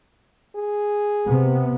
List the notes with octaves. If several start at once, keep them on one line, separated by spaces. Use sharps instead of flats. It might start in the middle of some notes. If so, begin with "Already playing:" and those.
G#4
C3 B3